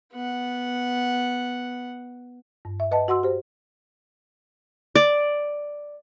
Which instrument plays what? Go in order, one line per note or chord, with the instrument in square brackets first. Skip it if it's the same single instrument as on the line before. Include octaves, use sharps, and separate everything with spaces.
[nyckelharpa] B3 F#5
[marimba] G2
E5
B4 D#5 F#5 A5
F#4 F#5 C6 E6
G4 C5
[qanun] D5